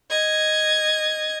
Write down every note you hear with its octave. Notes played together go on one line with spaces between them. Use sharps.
D#5 G#6